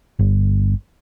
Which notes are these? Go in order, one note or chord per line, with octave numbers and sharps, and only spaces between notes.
G1